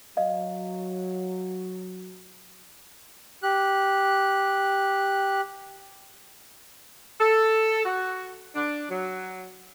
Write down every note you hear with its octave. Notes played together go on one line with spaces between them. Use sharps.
F#3 D#5 F5
G4 F#6
A4
F#4
D4
F#3